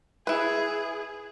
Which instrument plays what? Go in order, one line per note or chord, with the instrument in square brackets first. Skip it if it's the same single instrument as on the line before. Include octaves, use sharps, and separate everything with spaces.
[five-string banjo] E4 B4 [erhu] G#4